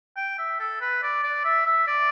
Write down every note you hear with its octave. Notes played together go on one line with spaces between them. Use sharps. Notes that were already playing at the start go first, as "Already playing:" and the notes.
G5
E5
A4
B4
D5
D5
E5
E5
D5